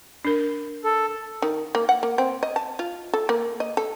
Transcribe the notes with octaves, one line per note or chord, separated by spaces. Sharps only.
D4 A#4
A4
D#3
A#3
F#5
A#3
C4
D#5
A5
F4
A4
A#3
D#5
A4